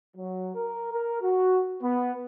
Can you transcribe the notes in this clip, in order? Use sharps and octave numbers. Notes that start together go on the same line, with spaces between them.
F#3
A#4
A#4
F#4
B3